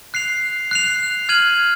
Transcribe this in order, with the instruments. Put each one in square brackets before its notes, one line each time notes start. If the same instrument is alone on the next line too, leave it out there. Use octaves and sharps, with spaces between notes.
[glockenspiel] F#6 C7 F7
F#6 C7 F7
F6 G#6 D#7 F#7